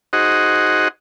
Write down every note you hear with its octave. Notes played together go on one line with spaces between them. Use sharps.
D#4 F#4 G#4 C5 D#5 F#5